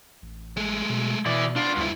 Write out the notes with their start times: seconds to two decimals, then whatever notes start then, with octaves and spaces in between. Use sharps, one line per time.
0.22 A1
0.57 G#3 A3
0.89 B2
1.26 B2 E3 E4 D5
1.56 B3 D4 F4
1.76 D2 G2 E4